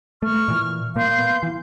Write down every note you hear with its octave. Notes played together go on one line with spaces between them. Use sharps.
A3 C#6 F6
A#2 E3
A#2 A#3 F5 C6 G6
B3
E3